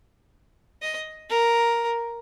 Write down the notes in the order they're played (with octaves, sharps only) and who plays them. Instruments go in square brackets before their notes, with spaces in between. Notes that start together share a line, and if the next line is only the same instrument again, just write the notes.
[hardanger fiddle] D#5
A#4